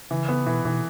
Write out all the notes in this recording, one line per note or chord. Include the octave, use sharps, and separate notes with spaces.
C#3 E3
B3
B2 E3
B2 E3